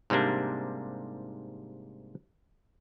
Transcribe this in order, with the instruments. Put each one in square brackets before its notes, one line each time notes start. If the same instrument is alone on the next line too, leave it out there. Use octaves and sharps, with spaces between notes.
[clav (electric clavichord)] G#2 C3 G3 A#3 D4